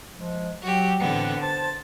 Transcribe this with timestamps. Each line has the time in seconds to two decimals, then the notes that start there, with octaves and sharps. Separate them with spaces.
0.16 F3 G#3
0.63 F#3 F#4 G4
0.99 A2 D3 E3 B3 C4 F#5
1.41 C5 A5 A6